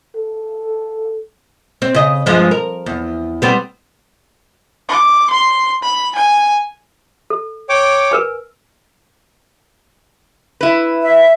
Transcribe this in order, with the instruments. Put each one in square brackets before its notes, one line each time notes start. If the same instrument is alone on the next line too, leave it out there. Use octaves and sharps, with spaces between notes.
[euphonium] A4
[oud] C4
C#3 D#5
G2 F3 G#3
A#4
E2
G3 B3 C4
[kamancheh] D6
C6
B5
G#5
[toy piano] A4
[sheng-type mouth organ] C#5 G5 D6
[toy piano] A#4 B4 G#5
[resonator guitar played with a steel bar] E4 B4
[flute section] E5